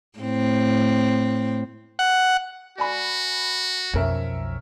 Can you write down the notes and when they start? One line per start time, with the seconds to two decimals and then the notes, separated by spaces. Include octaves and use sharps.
0.19 A2 C4
1.99 F#5
2.78 F#4 D5 G#5 B5
3.94 B1 F2 C#4 A#4 E5